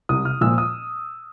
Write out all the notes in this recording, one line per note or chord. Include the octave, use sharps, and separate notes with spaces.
C2 D#6
F6
A#2 F3 E6
D#6